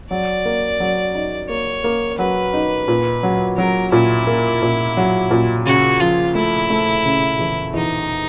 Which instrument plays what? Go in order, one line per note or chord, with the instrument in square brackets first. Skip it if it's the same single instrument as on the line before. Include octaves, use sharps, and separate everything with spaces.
[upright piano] F#3 [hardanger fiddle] D5
[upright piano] A#3
F#3
D#4
[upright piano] A#3 [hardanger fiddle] C#5
[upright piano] A#3
[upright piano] F#3 [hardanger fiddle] B4
[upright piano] D#4
A#2
F#3
[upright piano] F#3 [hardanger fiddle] A#4
[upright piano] A#2 [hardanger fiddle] E4
[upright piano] A#3
A#2
F#3
A#2
[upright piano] C#3 [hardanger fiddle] F#4
[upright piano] F3 [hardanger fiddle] F4
[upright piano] A3 [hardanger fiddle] E4
[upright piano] A3
C#3
E2
[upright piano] E2 [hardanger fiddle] D#4